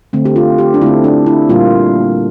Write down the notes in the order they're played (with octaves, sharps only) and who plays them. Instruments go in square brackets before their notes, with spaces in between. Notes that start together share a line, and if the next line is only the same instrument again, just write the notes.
[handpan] D3 A3 C4
G4
F4
G4
D4
D3 A3 C4 E4
D4
E4
A#2 G3 A#3 F4